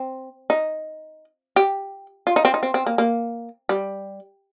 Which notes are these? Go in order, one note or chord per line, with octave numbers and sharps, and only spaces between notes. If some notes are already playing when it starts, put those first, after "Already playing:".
Already playing: C4
D#4
G4
F4
D#4
C4
D#4
C4
C4
A#3
A#3
G3